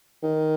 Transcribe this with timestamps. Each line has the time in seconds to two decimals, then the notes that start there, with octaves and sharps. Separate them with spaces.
0.23 D#3